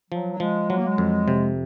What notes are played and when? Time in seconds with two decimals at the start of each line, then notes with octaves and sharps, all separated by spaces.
0.11 F3 F#3
0.32 F#3
0.40 F3 G#3
0.70 F#3 G#3
0.77 A#3
0.85 G#3
0.98 F2
1.28 C3